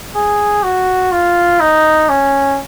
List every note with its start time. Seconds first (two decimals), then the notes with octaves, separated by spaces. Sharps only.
0.15 G#4
0.63 F#4
1.12 F4
1.60 D#4
2.09 C#4